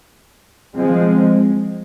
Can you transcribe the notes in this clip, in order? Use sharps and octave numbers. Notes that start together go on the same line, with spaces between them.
F3 G#3 C4